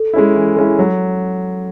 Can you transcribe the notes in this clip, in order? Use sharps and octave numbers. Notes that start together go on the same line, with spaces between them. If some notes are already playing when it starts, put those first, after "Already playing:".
Already playing: A4
G#3 C#4 E4
E3
G#3 C#4 E4
F#3